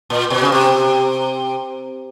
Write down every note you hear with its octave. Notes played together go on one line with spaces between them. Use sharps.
A#2
B2
C#3
C3